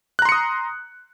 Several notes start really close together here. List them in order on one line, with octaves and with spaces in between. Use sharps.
F#6 A#5 C6 C#7 D#6